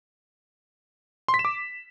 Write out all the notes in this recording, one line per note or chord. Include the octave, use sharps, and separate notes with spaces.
C6
B6
E7
D6